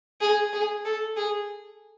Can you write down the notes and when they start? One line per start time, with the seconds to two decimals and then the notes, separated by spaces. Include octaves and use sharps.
0.21 G#4
0.53 G#4
0.85 A4
1.16 G#4